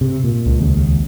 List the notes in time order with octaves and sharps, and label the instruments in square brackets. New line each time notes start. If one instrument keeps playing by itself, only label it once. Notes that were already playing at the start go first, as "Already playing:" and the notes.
[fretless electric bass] C3
A#2
[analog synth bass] C#2
[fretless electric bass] D#2 C#3